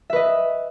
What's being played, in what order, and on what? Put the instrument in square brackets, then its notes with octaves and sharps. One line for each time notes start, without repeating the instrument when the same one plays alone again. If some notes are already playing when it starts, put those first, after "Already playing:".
[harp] E5
B4
D#5